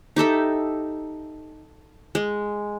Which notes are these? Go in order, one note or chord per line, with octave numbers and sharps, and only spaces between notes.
D#4 G4 A4 E5
G#3